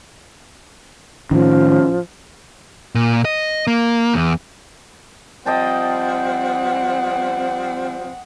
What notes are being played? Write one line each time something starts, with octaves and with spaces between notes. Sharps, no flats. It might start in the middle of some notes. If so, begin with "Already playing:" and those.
A2 D#3 F3 C#4
A#2
D#5
A#3
E2
F3 G3 C4 D#5 F#5 G5 A5